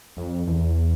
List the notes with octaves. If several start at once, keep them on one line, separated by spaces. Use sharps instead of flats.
F2
E2